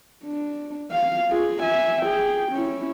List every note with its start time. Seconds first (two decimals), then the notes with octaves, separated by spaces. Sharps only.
0.25 D4
0.92 F5
1.30 F4 G#4
1.63 E5 G#5
2.02 G#4 G5
2.52 C#4 E4